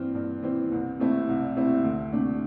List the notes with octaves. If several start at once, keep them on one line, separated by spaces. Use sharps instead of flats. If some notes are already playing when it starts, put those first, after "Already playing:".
Already playing: G2 E3 C4
G2
E3 C4
C2
C3 A3 C4 E4
C2
C3 A3 C4 E4
D2
C3 A3 D4